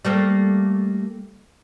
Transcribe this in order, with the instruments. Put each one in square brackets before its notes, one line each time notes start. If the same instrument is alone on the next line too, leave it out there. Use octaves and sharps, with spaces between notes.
[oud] G3 A3 A#3